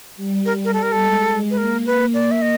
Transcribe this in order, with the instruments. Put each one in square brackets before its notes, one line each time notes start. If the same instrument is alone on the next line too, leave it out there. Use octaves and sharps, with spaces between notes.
[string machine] G3
[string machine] G3 [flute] A#4
[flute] A#4
A4
A#4
A4
[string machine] G#3
[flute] B4
[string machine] A#3 [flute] A#4
[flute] B4
D5
E5
D#5